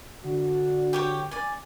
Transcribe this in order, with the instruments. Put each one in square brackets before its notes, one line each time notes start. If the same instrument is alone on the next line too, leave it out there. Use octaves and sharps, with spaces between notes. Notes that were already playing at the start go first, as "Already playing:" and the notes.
[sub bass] D3 [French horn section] D4 F#4
[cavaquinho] G4 C#5 G5
D5 G#5